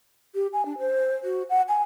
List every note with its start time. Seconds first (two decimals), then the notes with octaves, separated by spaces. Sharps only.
0.35 G4
0.53 G#5
0.66 D4
0.79 C5
1.24 F#4
1.50 F#5
1.69 G#5